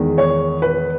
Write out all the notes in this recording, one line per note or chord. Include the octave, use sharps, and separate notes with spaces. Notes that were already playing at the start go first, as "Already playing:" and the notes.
Already playing: E2 D#3 G#3
C#5
B4